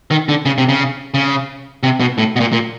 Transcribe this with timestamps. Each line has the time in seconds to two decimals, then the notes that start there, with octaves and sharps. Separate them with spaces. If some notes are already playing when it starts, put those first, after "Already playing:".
0.11 D#3
0.29 D3
0.46 C#3
0.58 C3
0.69 C#3
1.14 C#3
1.83 C3
2.00 B2
2.18 A2
2.36 B2
2.40 A#2
2.53 A#2